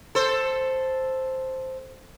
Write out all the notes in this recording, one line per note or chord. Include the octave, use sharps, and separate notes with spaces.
A4 C5